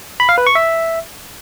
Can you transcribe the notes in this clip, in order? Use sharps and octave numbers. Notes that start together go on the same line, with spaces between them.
B5
F5
B4
C#6
E5